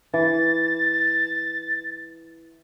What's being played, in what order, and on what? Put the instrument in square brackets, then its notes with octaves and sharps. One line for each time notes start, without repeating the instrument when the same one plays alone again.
[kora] E3 [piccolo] A6